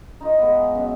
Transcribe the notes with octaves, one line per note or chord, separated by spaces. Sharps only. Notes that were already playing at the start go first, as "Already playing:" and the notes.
D#4 F4 D#5
G#3 B3
F#2 B2 E5 F#5